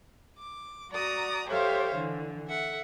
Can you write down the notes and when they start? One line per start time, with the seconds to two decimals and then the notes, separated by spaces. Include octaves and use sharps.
0.38 D6
0.91 F#4 D5 A#5 D#6
1.47 G4 A4 C5 C#5 E5 F5
1.96 D3 E3
2.47 A4 E5 F#5